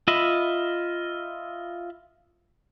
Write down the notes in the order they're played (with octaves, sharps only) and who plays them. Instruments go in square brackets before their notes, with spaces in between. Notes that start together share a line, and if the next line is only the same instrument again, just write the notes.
[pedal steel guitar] F4 D#5 E5 B5